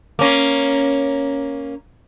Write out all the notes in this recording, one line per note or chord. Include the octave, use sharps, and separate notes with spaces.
A#3 C#4